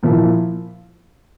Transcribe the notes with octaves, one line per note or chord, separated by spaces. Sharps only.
A#2 F3 A#3 E4